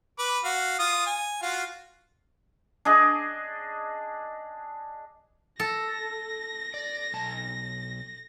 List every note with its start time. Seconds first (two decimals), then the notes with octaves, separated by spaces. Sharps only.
0.19 B4 D6
0.44 F#4 F5
0.79 F4 D#6
1.07 G#5
1.42 F4 F#4 F5
2.85 D4 G#4 D#5
5.60 A4 A#6
6.74 D5
7.14 B1 A5